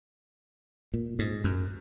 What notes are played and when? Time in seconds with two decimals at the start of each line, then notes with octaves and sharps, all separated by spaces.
0.94 A#2
1.19 G#2
1.44 F#2